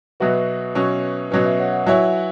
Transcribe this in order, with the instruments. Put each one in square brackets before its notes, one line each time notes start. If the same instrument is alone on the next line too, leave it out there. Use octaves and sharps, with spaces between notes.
[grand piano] B2 F#3 B3 F#4 [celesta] B4 E5
[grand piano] B2 F#3 C#4
[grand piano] B2 F#3 C#4 [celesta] B4
[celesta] B4 E5
C#5 F#5
C#5 F#5
[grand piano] F#3 E4 C#5 [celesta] E5 G#5